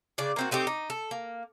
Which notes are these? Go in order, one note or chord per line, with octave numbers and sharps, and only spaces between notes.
C#3 D4 D5
A#3 C4 F#4
A3 C4 D#4 G4
D#4
A4
A#3